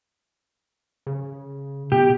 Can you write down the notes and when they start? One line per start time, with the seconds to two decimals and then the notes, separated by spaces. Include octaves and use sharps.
1.07 C#3
1.92 B2 G4